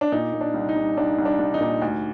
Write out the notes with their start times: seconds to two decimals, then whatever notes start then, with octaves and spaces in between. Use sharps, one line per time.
0.01 D4
0.12 A#2 D#4
0.33 A#2
0.41 D4
0.54 C2
0.69 D#4
0.76 C2
0.97 C2 D4
1.19 C2
1.25 D4
1.39 C2
1.54 D#4
1.61 A#2
1.82 D2